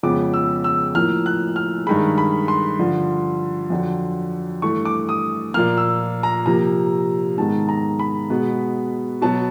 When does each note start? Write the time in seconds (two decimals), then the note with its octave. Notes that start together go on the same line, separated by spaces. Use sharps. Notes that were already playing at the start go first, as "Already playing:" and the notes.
0.03 F2 C#3 F3 G#3 B3 D6
0.34 E6
0.64 E6
0.95 A2 F3 A#3 F6
1.26 F#6
1.56 F6
1.86 G2 D#3 G#3 B5
2.18 B5
2.48 C6
2.79 G2 D3 F3
3.70 F2 D3 F#3
4.62 G2 E3 A3 C#6
4.85 D6
5.09 D#6
5.54 A#2 F3 A#3 F6
5.77 E6
6.23 A#5
6.46 C3 F3 A#3 A#5
7.38 G#2 D#3 G#3 B3 A5
7.69 A#5
7.99 B5
8.30 B2 G#3 B3
9.22 B2 F#3 B3 A5